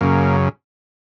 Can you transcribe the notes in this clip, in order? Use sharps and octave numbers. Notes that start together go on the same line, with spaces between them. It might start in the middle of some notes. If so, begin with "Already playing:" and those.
F#2 C#3 A#3